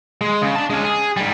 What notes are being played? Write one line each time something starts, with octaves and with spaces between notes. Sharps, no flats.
G#3
C#3
D4 A5
G#3 C#4
G#4
G#2 G3